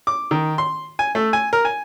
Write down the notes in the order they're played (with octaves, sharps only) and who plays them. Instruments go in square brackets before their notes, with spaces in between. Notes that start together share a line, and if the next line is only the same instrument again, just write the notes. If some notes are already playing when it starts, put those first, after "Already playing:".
[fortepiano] D6
D#3
C6
G#5
A3
G#5
A#4
G#5